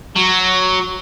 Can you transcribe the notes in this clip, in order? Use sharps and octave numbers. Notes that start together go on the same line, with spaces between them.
F#3